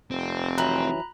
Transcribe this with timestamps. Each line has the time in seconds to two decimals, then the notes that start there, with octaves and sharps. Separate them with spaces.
0.11 F1 C4
0.58 E3 F#3 A#5 B5 F#6